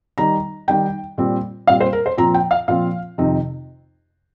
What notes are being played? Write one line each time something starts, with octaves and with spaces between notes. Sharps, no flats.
D#3 G3 D#4 A#5
D#3 G3 D#4 G5
A#2 G3 C4
A#2 G3 C4 F5
C5
A#4
C5
A#2 F3 C4 F4 A#5
G5
F5
A#2 F3 C4 F4 F5
F2 C3 D#3 C4 D#4